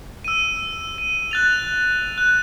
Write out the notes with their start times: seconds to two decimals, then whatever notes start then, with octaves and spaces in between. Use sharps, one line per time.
0.24 E6 D#7
0.98 D#7
1.31 F#6 A6 F7
2.18 F#6